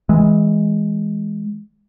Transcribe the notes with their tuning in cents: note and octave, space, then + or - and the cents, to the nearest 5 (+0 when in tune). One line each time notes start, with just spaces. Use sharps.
E3 -15 G#3 +0